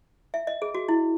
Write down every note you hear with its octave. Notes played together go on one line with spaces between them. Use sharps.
E5
D#5
G#4
F#4
E4